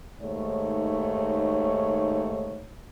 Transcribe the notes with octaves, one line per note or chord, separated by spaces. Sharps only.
D#2 G#2 A3 C#5